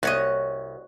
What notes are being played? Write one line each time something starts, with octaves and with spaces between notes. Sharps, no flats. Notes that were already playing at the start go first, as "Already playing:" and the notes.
C2 F#4 C#5 D#5